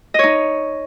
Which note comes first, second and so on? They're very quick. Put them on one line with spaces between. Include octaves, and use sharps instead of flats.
D#5 C#5 D#4